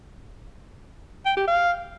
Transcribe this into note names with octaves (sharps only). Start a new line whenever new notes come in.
G5
G4
F5